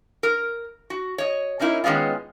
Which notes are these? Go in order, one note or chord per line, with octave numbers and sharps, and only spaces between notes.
A#4
F#4
C#5 D#5
A#3 C#4 D#4 E4 A#4
D#3 G#3 B3 C#4 F4